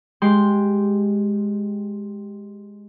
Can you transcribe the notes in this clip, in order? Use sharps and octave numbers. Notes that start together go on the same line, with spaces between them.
G#3 G4 C6